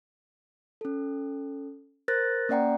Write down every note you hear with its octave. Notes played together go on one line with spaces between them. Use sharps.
C#4 A4
A#4 C5 F#6 A6 A#6
A#3 C#4 D5 F#5 G5 A#5